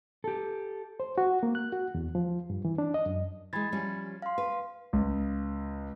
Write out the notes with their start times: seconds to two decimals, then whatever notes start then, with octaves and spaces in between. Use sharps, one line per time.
0.24 G4 A4
1.00 C5
1.18 F#4
1.43 A#3
1.55 F#6
1.72 F#4
1.95 E2
2.15 F3
2.50 G2
2.65 E3
2.78 D4
2.94 D#5
3.06 F#2
3.53 E3 G#3 B5 G#6 A6
3.72 F3 G3 C#4
4.22 F5 C6
4.38 B4
4.93 C#2